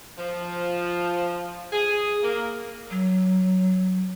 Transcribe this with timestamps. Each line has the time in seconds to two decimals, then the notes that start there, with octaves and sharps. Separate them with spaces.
0.18 F3
1.72 G#4
2.23 A#3
2.90 F#3